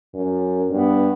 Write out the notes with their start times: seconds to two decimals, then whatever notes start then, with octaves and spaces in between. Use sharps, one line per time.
0.14 F#2
0.71 G2 B3